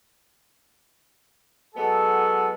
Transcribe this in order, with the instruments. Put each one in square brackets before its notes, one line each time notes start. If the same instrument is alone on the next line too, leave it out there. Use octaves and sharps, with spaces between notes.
[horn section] F#3 G#3 B3 A4